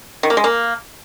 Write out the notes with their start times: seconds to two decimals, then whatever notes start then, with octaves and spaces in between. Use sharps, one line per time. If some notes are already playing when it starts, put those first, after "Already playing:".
0.23 D#3
0.30 A#3
0.37 G#3
0.44 A#3